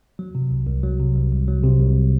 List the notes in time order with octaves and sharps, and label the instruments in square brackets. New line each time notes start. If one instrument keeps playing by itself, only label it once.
[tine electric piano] F#3
C3
C2
C2
F#3
C3
C2
C2
F#3
C3
C2